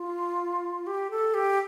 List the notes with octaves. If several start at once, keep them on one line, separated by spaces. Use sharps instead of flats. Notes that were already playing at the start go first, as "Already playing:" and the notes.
Already playing: F4
G4
A4
G4